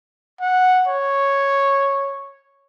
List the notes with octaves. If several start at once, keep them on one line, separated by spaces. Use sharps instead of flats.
F#5
C#5